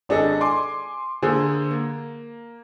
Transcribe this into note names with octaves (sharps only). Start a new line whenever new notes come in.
G#1 D4 G#4 A4 D#5
G#5 C6 D6
D3 A#3 G#4 C5
A#3